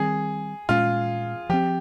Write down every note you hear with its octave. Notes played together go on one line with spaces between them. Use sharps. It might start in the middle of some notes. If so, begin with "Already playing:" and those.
Already playing: D#3 G3 C4 G#4
A#2 G#3 C#4 F4
F3 C4 G4